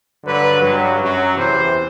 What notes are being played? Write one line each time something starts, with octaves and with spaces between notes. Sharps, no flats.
G2 D3 F#3 B4
G2 F#3
F#2 F#3
E2 C3 E3 C5